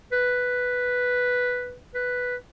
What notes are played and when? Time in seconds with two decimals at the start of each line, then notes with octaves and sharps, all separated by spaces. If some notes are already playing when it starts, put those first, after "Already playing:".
0.12 B4
1.95 B4